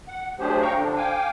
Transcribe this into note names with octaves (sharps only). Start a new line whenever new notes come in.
F#5
F#3 A3 D4 G4 G#4 C5
F5 G5 A#5 C#6
D3 F3 D4
F5 G5 G#5 D6